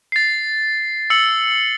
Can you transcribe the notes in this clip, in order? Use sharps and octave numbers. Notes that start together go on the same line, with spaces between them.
A6 C7
E6 C#7 F#7